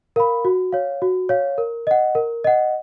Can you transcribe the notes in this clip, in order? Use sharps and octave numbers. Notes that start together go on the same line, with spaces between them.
A#4 F5 B5
F#4
C#5 F5
F#4
C#5 F5
A#4
D#5 F#5
A#4
D#5 F#5